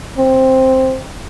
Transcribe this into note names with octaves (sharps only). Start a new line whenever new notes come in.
C4